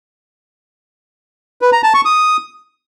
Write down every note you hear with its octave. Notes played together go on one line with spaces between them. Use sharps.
B4
A#5
A5
C#6
D#6